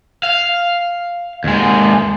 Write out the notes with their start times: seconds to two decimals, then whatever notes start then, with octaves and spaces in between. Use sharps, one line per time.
0.23 F5
1.44 D#2 G#3